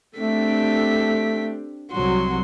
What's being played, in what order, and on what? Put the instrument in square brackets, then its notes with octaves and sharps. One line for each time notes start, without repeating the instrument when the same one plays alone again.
[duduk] A3 [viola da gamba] C4 D4 G4 [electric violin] A4 B6
[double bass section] C2 F#3 [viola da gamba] C3 F#4 [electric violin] C6